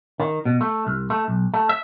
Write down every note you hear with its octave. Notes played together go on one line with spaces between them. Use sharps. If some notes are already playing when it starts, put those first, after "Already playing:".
D#3
B2
A3
C2
A3
B1
A3
E5